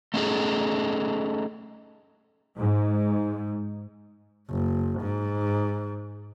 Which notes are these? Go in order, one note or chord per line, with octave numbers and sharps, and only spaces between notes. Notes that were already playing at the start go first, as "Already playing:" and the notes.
A3 C#4 D#4 E4 G#4 A4
G#2
F#1
G#2